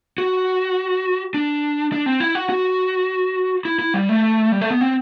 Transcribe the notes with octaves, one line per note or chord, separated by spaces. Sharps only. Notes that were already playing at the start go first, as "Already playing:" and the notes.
F#4
D4
D4
C4
E4
F#4
F#4
E4
E4
G3
A3
G3
A3
B3
C4